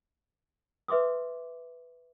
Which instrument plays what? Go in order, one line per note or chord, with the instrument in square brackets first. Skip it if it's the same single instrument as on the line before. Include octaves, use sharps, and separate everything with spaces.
[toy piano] B4 E5 C6 D6 D#6